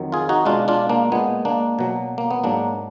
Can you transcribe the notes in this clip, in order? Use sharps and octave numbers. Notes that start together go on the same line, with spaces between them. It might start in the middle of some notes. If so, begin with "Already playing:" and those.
Already playing: F2 D#3 F#3
F4 G#4
D#4 F#4
B2 G#3 D4 F4
D4 F4
A#3 D4
A#2 G#3 B3
A#3 D4
B2 F#3
A#3
B3
G#2 F#3 A#3 D4